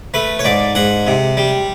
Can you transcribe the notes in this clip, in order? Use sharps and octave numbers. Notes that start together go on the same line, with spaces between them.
A3 B4
C#5
G#2 D5
G#2 F#5
C3
G3